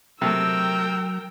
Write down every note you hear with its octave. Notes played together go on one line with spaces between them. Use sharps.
C3 F#3 A3 A#4 G5 E6